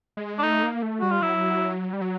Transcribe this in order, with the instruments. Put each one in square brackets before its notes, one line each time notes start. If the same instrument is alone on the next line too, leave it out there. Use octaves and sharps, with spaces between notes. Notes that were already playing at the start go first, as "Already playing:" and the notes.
[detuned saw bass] G#3
[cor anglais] D4
[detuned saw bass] A3 [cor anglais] D#4
[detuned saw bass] A#3
A3
[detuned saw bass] G3 [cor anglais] F#4
[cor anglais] F4
[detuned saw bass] F#3 [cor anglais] E4
[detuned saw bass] G3
F#3